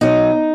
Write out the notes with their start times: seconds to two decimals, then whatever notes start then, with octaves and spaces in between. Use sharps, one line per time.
0.01 B2 F#3 D#4